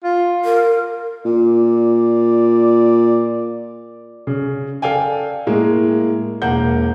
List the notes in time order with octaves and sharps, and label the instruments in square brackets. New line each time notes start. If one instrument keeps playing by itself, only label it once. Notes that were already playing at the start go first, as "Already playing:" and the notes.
[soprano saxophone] F4
[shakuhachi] A#4
[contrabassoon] A#2 [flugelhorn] D5
[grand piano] C#3
A4 D5 F5 G5 G#5
A2 G#3 A#3
E1 A#3 F#5 G6